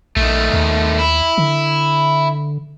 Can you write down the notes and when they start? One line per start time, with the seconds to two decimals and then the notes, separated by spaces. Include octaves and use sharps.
0.16 A#1 D#3 A3
0.53 D#2
0.99 E4
1.38 D3